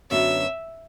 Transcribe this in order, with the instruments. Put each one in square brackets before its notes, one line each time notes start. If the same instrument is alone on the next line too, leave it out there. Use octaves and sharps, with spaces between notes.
[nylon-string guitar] F#2 D3 F#3 B3 [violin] E5